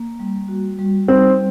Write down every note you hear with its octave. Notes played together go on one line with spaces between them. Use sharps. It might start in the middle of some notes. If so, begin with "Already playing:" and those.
Already playing: A#3
G3
F#4
G3
C4 D#4